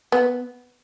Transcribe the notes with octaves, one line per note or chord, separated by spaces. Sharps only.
B3